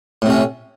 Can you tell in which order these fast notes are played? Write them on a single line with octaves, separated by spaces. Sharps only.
A2 C3 C#4